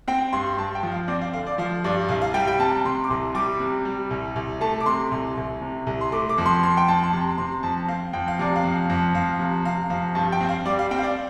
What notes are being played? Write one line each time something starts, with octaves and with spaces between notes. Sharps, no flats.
C4 G5
G2 C6
G2 A5
G5
F3
F5
C4 D5
F5
D3 F5
D5
F3 F5
G2 D5
C2 F5
F5
G3 G5
G5
C3 A5
C3 C6
D6
C2 C6
G3 D6
C3
G3
C2
C2
A3 A5
D6
C3 C6
C2
C2
C3
C2
C6
A3 D6
D6
F2
C6
F2 C6
G5
F2 A5
C6
C3 A5
C3 C6
F2 A5
C4 F5
F2 G5
F5
C3 D5
F5
F2
F2
F2 F5
C3
C3 F5
F2 F5
G2 A5
G5
C4
F5
G3 D5
F5
C4 G5
F5
D5